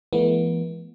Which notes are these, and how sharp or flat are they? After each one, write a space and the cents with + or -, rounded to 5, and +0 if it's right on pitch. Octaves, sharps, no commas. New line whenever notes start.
E3 +35 G#3 +45 B3 -40